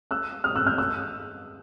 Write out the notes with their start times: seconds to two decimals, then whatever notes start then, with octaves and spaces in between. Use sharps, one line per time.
0.11 E6 F#6
0.44 D#6 F6
0.56 E6 F#6
0.67 F6 G6
0.78 E6 F#6